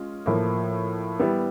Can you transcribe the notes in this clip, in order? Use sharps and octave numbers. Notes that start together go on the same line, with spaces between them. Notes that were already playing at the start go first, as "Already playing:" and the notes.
Already playing: G#3 C#4 F4
A2 F3 A#3
G3 B3 E4